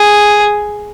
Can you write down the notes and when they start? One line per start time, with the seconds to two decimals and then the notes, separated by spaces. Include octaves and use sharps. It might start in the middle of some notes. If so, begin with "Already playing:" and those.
Already playing: G#4